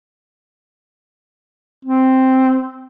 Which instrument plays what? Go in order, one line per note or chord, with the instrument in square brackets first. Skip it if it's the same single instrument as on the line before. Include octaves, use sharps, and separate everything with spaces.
[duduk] C4